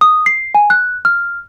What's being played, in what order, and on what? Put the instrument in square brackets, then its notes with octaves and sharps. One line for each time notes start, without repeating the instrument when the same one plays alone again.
[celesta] D#6
C7
G#5
F#6
F6